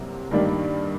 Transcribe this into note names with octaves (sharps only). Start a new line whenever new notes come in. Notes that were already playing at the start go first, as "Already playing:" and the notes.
Already playing: C2 C3 F#3 A#3
G2 D#3 G3 A#3 D4